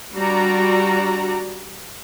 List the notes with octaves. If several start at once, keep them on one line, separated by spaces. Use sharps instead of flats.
G3 D4 F#4 D5 A#5